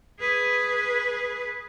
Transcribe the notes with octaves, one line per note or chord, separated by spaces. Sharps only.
G#4 B4